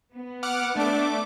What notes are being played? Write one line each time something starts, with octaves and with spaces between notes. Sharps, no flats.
B3
F#5 D6 F6
A3 D4 D6